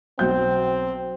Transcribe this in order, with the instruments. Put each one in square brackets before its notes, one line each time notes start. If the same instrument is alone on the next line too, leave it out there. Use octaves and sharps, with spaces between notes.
[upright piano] B1 G6 [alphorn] C4